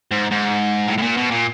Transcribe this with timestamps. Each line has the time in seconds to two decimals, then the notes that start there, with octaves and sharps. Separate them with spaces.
0.12 G#2
0.31 G#2
0.88 A2
0.98 A2
1.02 A#2
1.17 B2
1.31 A#2